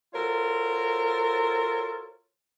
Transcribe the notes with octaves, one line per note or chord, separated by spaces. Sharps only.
F4 F#4 A4 A#4 C5 C#5